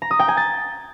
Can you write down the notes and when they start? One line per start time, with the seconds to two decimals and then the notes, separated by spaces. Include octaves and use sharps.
0.02 A#5
0.11 D#6
0.19 G5
0.28 G#5
0.37 A6